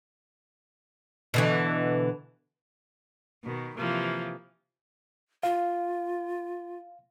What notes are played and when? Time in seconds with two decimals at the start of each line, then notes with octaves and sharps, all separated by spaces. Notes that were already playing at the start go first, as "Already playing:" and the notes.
1.34 B2 D3 E3
3.44 B2 D#3
3.78 C3 E3 F3 A#3
5.43 F4 F5